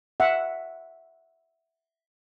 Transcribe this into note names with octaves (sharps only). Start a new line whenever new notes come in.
E5 F#5